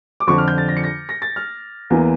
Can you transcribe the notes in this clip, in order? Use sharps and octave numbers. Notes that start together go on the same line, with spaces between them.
D6
F2 D3 F3 C#6
F6
G6
A6
A#6
C#7
A#6
A#6
A6
F6
E2 E3 A#3